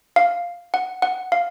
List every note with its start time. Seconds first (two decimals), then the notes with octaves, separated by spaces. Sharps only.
0.16 F5
0.74 F#5
1.02 F#5
1.32 F5